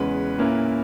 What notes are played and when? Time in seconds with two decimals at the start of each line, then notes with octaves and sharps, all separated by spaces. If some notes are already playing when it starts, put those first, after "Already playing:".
Already playing: E2 C#3 G#3 C#4 B4
0.38 A#2 A#3 C#4 E4